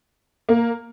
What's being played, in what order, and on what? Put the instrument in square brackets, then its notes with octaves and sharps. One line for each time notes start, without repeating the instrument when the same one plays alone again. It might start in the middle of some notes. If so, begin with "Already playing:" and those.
[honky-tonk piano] A#3